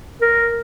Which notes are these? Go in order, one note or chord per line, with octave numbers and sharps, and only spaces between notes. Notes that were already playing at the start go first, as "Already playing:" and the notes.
A#4